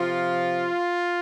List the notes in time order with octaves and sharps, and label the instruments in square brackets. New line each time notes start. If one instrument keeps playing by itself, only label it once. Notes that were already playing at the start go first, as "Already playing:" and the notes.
Already playing: [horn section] C3 F3 F4